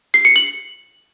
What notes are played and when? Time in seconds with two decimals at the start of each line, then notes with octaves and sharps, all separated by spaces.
0.14 C7
0.25 C#7
0.36 F#7